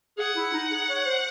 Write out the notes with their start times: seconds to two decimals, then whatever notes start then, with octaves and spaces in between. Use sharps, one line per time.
0.18 G#4 F#5
0.36 E4
0.53 D#4
0.71 G#4
0.89 C#5
1.05 C5